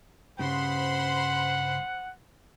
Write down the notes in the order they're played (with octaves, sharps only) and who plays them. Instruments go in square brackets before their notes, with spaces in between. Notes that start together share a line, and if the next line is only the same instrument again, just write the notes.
[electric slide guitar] G2 C#3 [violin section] C5 B5 C6 [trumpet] F#5